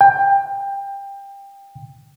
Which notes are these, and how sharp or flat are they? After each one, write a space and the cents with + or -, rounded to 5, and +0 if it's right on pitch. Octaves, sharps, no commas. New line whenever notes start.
G5 +20